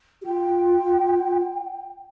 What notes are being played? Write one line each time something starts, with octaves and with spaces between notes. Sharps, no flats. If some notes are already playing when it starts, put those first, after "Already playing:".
G4
F4 G5